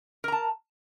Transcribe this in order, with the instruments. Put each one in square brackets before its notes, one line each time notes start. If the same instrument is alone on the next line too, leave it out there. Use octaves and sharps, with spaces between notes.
[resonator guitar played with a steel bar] A#4
A#5
A5